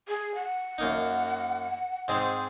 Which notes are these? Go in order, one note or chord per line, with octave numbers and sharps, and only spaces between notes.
G#4
F#5
F#2 A#3 D#4
G#2 G#3 C4